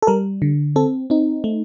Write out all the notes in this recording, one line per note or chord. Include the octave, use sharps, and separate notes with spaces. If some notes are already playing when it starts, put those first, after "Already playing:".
A4
G3 A#4
D3
C4 A4
C4 D#4
A3